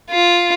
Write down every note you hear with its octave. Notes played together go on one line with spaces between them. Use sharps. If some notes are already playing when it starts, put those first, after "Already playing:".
F4